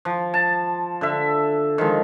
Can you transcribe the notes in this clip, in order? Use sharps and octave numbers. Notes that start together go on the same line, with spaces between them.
F3
A5
D3 E5
D#3 F3 G#3